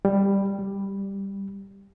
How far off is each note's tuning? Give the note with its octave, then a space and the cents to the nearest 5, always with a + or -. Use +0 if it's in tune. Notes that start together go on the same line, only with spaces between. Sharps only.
G3 +10
G3 +5